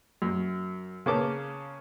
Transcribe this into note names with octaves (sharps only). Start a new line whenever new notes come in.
F#2
C#3 A#3 C#4 B4 A5 D6